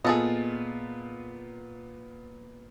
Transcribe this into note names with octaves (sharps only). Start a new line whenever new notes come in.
A#2 B3 F4 G#4 A4 D#5